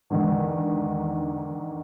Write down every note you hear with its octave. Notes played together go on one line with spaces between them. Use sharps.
E2 G#2 D3 D#3